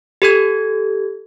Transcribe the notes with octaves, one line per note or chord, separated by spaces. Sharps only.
G4 A4 G#6